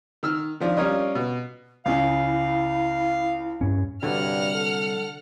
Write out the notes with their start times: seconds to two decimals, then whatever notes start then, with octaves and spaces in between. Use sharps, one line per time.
0.23 D#3 E6 F6
0.60 D#3 F3 D4
0.77 G3 C#4 F4 A#4 C#5 D#5
1.15 B2
1.86 C#2 C#3 E4 F5
3.61 G2 C#4
4.03 C2 G2 D3 F#3 F#5 F6
4.54 A4